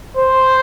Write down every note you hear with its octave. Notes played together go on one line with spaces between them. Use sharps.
C5